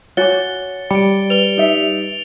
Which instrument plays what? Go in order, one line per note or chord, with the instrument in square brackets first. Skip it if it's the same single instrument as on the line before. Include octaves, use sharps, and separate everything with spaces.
[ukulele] F#4 [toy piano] C#5 G#5 D6 [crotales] A6 C#7 G7
[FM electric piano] G3 [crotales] C#7 D7
[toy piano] B4 [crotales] F7 G7
[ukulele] D#4 E5